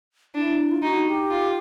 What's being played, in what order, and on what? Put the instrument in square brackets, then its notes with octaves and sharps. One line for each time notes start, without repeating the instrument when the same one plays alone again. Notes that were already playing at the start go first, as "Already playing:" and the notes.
[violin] D4 [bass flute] E4
[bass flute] F4
[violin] D#4 [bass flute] F#4
[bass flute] G4
[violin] F4